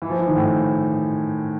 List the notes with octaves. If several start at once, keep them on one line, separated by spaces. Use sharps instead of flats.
E3
F3
E3
D#3
A2